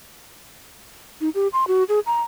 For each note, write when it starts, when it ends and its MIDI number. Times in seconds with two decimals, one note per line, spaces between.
1.21 1.29 63
1.35 1.48 67
1.53 1.67 84
1.68 1.84 66
1.89 2.00 68
2.07 2.22 82